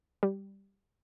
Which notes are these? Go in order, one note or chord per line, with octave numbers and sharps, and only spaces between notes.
G3